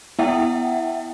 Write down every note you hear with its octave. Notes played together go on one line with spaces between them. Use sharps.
B3 E4 E5 F#5 G5